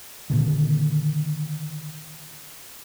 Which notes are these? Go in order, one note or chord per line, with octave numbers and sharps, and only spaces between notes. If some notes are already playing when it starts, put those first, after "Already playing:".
A#2 D3 D#3